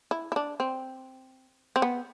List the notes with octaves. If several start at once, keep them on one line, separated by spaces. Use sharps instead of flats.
E4
E4
D4
C4
C4
B3